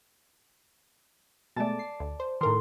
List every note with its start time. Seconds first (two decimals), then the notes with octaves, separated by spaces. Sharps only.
1.56 B2 G#3 A3 D5 A5
1.79 C7
2.00 D2
2.20 C5
2.41 A2 D#3 A#4 C6